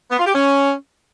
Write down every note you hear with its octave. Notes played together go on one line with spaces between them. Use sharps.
B3
F4
G4
C#4